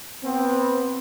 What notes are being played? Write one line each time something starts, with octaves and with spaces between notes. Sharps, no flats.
B3 C4